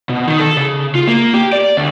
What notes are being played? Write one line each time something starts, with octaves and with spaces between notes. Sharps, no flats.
B2
D#3
A4
C#3
F4
A#3
G4
D5
D2